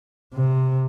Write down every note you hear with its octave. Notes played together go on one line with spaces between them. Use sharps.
C3